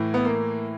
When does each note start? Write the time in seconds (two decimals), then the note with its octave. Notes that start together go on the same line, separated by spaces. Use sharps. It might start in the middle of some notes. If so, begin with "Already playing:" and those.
Already playing: A2 E3
0.14 B3
0.25 A#3